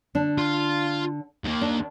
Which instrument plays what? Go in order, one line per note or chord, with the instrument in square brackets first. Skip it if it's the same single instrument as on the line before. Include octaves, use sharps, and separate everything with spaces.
[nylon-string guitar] D3 D4
[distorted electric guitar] F4 F5
D#2 A#3
[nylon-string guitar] D4